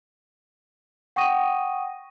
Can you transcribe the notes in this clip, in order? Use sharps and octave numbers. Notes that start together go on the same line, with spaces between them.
F#5 G5 C#6 D#6 A#6 D#7